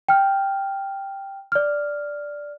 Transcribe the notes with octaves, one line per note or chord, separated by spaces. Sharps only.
G5 F6
D5 F6